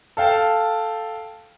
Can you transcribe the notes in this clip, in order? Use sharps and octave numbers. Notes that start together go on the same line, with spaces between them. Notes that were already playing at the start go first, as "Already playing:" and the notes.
A4 F5 G5 A5